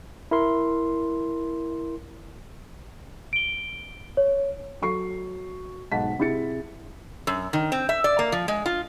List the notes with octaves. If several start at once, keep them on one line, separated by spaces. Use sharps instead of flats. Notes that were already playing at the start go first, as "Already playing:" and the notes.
E4 A#4 C6
D7 G7
C#5
F#3 A4 C#6 C7
B1 G#2 F#5 A5 B6
C3 E4 G#4 A6 C#7
F#2
D#3
C4
E5
D5
A#3
F3
G#3
F4